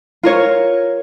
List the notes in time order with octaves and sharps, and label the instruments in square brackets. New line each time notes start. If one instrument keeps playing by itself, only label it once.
[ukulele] F4 A#4 C#5